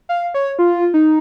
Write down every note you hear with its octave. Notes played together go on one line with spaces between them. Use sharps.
F5
C#5
F4
D#4